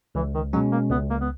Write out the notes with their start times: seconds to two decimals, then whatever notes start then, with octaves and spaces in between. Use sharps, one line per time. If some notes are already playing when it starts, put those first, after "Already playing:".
0.15 C#2 E3
0.35 D#3
0.53 B2 F#3 G#3 C#4
0.72 A#3
0.91 C#2 B3
1.10 A#3
1.21 B3